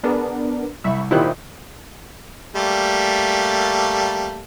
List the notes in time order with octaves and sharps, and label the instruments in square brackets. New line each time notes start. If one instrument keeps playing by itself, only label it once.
[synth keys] B3 D4 A#4 [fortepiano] G#4
[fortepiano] C2 [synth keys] E5 B5 C#6
[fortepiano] A#2 D#3 F#6 [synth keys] E4 G4 C5
[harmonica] G3 A3 A#3